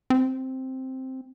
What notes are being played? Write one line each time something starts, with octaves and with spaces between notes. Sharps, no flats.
C4